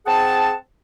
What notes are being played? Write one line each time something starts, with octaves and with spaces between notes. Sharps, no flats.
C4 G#4 F#5 A5